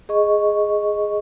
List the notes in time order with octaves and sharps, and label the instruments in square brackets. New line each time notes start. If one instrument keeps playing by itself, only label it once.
[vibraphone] G#4 D#5 C#6